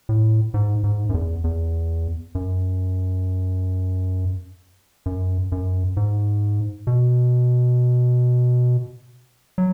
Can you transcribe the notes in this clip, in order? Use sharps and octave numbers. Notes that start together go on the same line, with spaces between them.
A2
G#2
G#2
F#2
E2
E2
F#2
F#2
F#2
G#2
B2
F#3